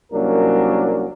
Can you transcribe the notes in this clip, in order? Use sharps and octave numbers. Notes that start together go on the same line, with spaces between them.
C2 F#3 A#3 C#4 D4 A#4